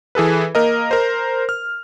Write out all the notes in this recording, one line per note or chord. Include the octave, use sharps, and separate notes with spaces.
E3 G#4 A4 B4
A#3 A#4 D#5
A#4 C5
F6